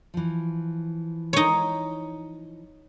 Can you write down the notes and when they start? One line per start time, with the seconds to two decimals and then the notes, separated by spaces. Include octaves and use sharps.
0.14 E3 F3
1.33 D#4 C#5